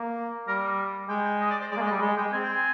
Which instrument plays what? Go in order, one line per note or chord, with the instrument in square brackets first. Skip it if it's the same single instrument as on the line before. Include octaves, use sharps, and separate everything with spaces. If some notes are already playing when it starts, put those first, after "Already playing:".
Already playing: [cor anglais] A#3
[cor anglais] G3 [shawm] A#4
[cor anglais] G#3 [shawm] G5
[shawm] G5
D#5
D5
C5
[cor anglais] G#3 [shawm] D5
[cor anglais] A#3
G#3
[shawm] D#5
[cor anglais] G3
G#3
[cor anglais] G#3 [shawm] G5
[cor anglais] C4 [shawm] G#5
[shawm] G5
G#5